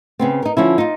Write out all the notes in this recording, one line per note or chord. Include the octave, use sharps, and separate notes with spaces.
C#3 B3 C4
D#4 A#4
D3 F3 C#4 E4
D#4 F4